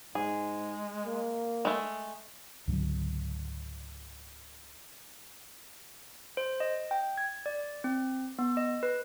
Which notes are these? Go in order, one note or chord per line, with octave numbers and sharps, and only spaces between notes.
G#2 G#3 G#4
A#3
G#3 A3
C#2 G#2 D3 F#3
C5
D#5
G5
G#6
D5
C4
B3
D#5
B4